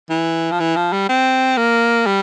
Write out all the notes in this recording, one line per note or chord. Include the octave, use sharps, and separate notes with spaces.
E3
F3
E3
F3
G3
C4
A#3
G3